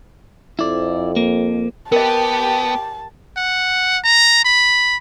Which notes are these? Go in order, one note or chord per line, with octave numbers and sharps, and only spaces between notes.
F2 E4 D5
A#3
B3 G4 A#4 D#5 A5
F#5
A#5
B5